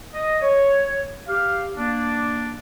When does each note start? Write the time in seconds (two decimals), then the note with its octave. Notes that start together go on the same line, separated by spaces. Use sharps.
0.14 D#5
0.42 C#5
1.28 G4 F5
1.76 A#3 D4